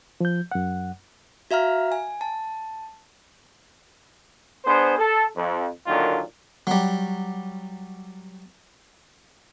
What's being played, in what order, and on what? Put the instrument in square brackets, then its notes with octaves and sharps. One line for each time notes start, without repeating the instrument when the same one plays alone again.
[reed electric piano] F3 G6
F#2 F#5
[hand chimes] F#4 E5 F5 A#5 F6
G#5
A5
[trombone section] B3 D4 G#4 C5
A4
F2
A#2 D3 D#3 F#3 A#3 F4
[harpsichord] F#3 G3